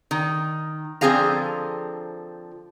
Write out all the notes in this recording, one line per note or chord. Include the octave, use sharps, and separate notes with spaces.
D#3
D3 F3 C4 G#4 F5 A#5